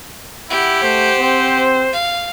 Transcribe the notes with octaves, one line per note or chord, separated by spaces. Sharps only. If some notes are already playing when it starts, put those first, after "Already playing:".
E4 G4 F#5
A3 C5
C4
F5